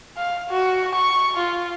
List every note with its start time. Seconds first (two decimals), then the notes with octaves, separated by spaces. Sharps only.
0.17 F5
0.50 F#4
0.95 C#6
1.37 F4